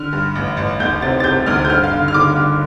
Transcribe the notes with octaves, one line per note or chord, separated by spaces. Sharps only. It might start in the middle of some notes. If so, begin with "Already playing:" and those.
Already playing: D3 F6
G2
A1
A1
D2 G6
C3 A6
A6
C3 G6
D2 F6
G6
G2 F6
F5
D3
F6
D3 D6
D3